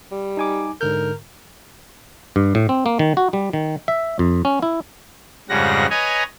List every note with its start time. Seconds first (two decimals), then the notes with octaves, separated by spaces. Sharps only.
0.12 G3
0.37 D#4 G#5 D6
0.81 G#2 D3 A#4 G6
2.36 G2
2.55 A2
2.69 C4
2.86 A#3
2.99 D#3
3.17 F#4
3.33 G3
3.53 D#3
3.88 E5
4.19 F2
4.45 C#4
4.63 E4
5.49 F2 G#2 C#3 G3 F#5 A#6
5.90 B4 C#5 D#5 G#5 A#5